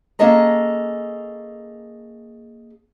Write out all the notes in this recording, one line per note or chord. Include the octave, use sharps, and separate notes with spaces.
A#3 C#4 G#4 A4 D#5 A#5